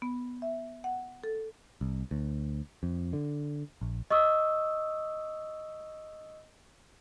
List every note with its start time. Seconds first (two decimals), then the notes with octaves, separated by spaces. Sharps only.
0.02 B3
0.42 E5
0.84 F#5
1.24 A4
1.81 C2
2.11 D2
2.83 F2
3.13 D3
3.81 A#1
4.10 D#5 C#6 D#6 E6